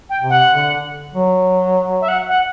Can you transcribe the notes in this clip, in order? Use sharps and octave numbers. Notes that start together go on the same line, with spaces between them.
G5
C3
F#5
D3
F#3
E5
F#5
F#5